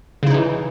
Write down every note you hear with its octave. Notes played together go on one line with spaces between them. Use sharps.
C#3 E3 D#4 E4